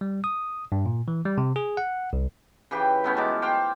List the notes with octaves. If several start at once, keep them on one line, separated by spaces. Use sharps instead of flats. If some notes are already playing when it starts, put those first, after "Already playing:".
G3
D#6
G2
A#2
E3
G3
C3
G#4
F#5
C2
C#3 E3 G4 G5
A3 B3 C#4
F#3 G#3 A5 D6
C5 F5 G5 D6